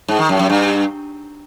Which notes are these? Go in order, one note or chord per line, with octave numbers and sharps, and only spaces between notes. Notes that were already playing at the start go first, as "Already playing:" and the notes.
G#2
D#3
F#2
F#2
G2